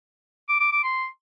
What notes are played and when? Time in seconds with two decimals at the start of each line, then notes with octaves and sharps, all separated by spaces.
0.49 D6
0.60 D6
0.72 D6
0.84 C6